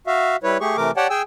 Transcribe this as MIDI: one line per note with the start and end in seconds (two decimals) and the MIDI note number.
0.07 0.36 66
0.07 0.36 76
0.07 0.36 77
0.43 0.58 55
0.43 0.58 64
0.43 0.58 71
0.43 0.58 73
0.60 0.77 57
0.60 0.77 67
0.60 0.77 68
0.60 0.77 85
0.77 0.91 48
0.77 0.91 52
0.77 0.91 57
0.77 0.91 70
0.77 0.91 86
0.97 1.07 67
0.97 1.07 73
0.97 1.07 74
0.97 1.07 78
0.97 1.07 79
0.97 1.07 81
1.10 1.22 68
1.10 1.22 79
1.10 1.22 80
1.10 1.22 88